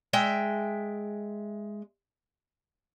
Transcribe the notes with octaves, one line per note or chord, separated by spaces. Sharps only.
G#3 E5 G5